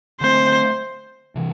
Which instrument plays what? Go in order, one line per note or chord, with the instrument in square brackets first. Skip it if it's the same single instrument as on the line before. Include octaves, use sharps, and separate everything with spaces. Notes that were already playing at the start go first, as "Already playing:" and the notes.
[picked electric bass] D3 A3 C4 [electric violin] C5
[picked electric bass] C3 E3